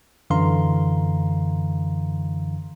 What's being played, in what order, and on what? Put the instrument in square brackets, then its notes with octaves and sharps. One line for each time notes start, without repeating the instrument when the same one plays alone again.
[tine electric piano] F#2 D3 E3 F5 A#5 C6